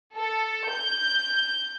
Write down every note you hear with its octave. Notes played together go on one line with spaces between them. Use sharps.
A4
G6